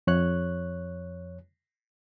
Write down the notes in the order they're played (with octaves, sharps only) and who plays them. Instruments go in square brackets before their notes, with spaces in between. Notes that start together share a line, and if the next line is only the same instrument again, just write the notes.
[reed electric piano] F2 C#5 F#6